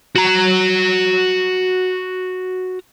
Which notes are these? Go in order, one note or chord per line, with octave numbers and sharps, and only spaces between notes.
F#4 A#5